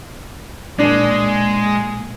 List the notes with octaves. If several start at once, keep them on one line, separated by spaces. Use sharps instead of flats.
A#2 G#3 A#3 D4